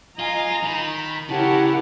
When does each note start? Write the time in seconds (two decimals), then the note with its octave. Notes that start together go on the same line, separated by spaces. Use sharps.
0.19 F4 D#5 F5 G#5 A#5
0.63 D#3 B5
1.29 C#3 E4 G4 A#4 C#5 F#5 A5